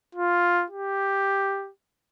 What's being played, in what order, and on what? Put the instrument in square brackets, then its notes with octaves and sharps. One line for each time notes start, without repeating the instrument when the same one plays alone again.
[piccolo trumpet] F4
G4